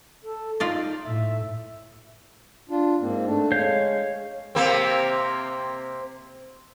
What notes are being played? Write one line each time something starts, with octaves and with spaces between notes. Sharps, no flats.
A4
D#4 F4 D5 D#5
A2 E5
D4 F4
G#2 A#3 C4
A3 D4
G#3 C#5 F5 G6
C3 A#3 C4